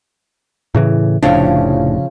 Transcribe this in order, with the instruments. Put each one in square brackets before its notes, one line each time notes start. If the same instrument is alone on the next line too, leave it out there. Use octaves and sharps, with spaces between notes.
[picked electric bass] A2 C#3 E3
[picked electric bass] F1 A2 D4 [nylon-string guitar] C#3 F3 F5